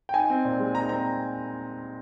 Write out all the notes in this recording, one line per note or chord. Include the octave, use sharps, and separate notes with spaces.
G5
D#4 G#5
C4
A#2
G#3
D#4 A#5
C4 A#5